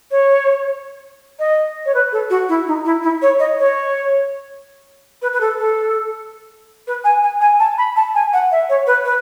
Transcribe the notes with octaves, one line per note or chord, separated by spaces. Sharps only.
C#5
D#5
C#5
B4
A4
F#4
E4
D#4
E4
E4
C#5
D#5
C#5
B4
B4
A4
A4
B4
G#5
G#5
G#5
A5
B5
A5
G#5
F#5
E5
C#5
B4
B4